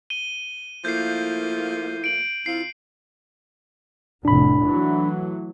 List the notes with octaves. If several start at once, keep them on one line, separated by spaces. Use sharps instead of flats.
D#7 G7
F3 A3 A#3 E4 G6 C7
D7 F#7
F2 C4 E4 F4 C7
F1 A2 D4 B5
E3 F#3 A3